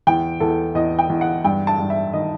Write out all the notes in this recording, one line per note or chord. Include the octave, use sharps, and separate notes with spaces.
E2 G5
E2 A4
E2 D#5
G5
E2
F#5
G2 G5
A5
G2
E5
D#3 D#5